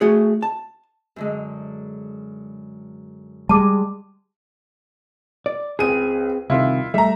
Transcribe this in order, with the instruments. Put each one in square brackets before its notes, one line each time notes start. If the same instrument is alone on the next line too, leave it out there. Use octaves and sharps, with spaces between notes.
[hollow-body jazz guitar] A3 F#4 G#4
A5
[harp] F#2 D3 G#3
[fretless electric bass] G3 G#3 [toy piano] A5 D6
[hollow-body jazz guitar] D5
[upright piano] C#2 D#7 [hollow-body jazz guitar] C4 G#4
[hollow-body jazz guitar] C2 C3 D#3 [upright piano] E4 F4
[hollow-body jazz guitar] G3 A3 [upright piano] E5 A#5